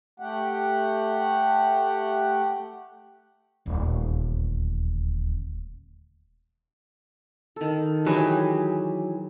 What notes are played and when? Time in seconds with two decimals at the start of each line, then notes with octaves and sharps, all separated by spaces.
0.20 A3 G4 F#5
3.66 D#1 D2
7.56 D#3 A4
8.06 E3 F#3 G4 G#4